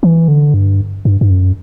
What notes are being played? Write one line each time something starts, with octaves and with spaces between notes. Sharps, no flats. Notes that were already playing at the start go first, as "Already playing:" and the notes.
E3
D3
G2
G2
G2
F#2